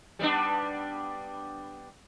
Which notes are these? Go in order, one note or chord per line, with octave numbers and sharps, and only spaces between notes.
G3 B3 D4